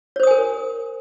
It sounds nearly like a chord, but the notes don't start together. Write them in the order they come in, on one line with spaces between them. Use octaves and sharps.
C#5 C5 D#6 G#5 A#4